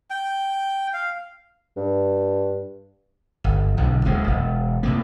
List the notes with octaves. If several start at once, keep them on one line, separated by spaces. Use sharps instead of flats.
G5
F5
G2
G1
B1 D3
D1 D#2 A2 G#3
E1
A2 C3 A#3